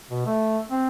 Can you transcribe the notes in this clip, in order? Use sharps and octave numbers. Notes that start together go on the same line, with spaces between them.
B2
A3
C4